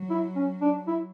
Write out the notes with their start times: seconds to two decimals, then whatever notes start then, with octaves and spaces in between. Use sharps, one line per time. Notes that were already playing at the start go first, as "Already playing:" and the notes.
Already playing: F#3
0.10 E4
0.36 C#4
0.62 D4
0.87 E4